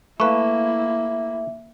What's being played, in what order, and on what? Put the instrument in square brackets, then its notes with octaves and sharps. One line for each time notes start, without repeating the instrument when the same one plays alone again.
[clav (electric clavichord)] A3 B4 [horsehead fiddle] A#3 E4 [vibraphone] E5 [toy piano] F5 C#6